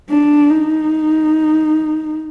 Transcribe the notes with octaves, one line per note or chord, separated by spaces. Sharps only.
D4
D#4